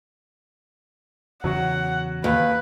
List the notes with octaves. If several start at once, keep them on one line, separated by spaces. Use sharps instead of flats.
E2 C#3 F#3 F#4 F#5
D#2 B4